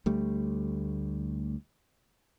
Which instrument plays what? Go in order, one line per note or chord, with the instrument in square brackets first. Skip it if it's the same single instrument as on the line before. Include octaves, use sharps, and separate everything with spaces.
[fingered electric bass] D2 G3 A3